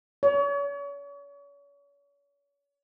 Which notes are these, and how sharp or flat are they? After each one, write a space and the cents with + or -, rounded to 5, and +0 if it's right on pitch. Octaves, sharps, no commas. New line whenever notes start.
C#5 +40